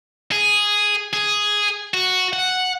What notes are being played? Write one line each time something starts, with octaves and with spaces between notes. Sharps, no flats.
G#4
G#4
F#4
F#5